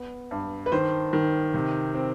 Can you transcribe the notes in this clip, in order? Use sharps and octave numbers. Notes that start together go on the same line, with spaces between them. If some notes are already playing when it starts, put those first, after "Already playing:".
Already playing: B3
G2
B4
D#3 C5
D#3
C3
C4